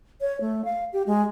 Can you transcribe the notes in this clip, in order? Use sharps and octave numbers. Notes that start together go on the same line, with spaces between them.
C#5
A3
F5
G4
G#3